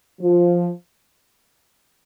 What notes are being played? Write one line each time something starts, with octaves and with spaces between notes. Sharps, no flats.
F3